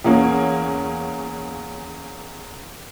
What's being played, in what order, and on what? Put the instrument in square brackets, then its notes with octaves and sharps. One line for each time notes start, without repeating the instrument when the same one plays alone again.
[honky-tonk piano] E2 A#3 C#4